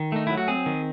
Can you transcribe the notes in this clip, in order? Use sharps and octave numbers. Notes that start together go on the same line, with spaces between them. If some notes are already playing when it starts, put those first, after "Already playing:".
Already playing: D#3
A3 D#4
F#3 E4
F#4
C4 G#4
D#3